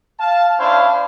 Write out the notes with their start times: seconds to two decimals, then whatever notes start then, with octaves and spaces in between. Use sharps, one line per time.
0.20 F5 A5
0.59 C#4 D4 E4 C5 F5